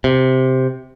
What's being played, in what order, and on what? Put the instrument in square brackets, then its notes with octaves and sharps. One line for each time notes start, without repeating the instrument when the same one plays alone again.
[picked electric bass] C3